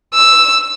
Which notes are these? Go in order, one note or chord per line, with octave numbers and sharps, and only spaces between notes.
E6